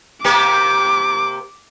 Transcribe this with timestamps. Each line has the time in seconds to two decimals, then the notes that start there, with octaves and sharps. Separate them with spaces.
0.24 C3 A#3 G4 D6